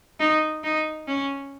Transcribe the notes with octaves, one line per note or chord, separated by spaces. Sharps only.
D#4
D#4
C#4